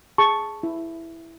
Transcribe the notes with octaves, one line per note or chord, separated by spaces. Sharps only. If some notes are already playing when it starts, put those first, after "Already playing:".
G#4 A5 C#6
E4